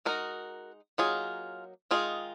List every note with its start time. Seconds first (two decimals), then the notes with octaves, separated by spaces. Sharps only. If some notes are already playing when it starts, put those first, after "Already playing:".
0.05 G#3 D#4 F#4 A#4
0.98 F#3 A#3 D#4 F4 G#4
1.91 D#3 G#3 D#4 F4 G#4